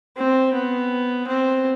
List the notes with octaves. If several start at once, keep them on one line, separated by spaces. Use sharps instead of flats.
C4
B3
C4